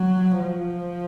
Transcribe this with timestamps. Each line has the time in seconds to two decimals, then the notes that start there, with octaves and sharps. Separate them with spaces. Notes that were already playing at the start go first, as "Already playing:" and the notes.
Already playing: F#3
0.39 F3